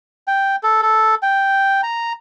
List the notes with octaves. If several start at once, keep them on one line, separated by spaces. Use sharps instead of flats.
G5
A4
A4
G5
A#5